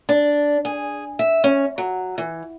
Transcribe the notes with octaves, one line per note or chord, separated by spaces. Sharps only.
D4
G#4
E5
C#4
F#3
E3